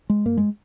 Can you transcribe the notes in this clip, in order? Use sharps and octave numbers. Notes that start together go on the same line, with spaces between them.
G#3
G2 A#3
G#3